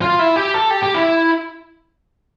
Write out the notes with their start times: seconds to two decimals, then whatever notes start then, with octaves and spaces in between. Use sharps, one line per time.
0.02 F4
0.19 E4
0.36 G4
0.54 A4
0.70 G4
0.83 G4
0.94 E4